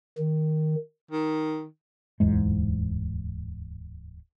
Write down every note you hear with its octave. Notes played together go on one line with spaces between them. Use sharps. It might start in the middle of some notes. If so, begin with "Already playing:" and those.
D#3
D#3
D1 E2 G#2 G#3